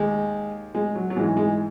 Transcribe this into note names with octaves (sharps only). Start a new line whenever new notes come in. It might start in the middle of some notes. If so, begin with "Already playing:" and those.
Already playing: D#2 G#3
G#3
F#3
F#3
G#2 E3 G#3
G#3